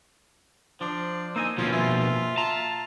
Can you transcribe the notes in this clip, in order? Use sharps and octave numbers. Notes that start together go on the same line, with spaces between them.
F3 D4 C5
A#3 D#4 D#5 G#5 E6
B2 F3 C#4 F4
F4 E5
F4 A5 A#5